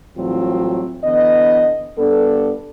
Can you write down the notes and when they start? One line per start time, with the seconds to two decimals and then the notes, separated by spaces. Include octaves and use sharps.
0.17 A2 E3 F#3 G3 C4 F4
1.04 D3 E3 B3 D#5
1.98 G2 B3 D4 A4